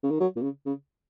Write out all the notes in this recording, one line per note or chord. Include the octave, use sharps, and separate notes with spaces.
C#3
D#3
F#3
A#2
C#3
C#3